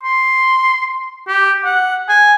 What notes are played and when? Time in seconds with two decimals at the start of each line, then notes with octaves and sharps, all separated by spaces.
0.03 C6
1.27 G4
1.64 F#5
2.09 G#5